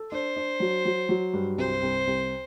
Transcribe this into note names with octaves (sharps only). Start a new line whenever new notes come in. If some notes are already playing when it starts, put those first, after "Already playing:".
Already playing: A4
D4 C5
D4
F#3
F#3
F#3
G2
C2 C5
C2
C2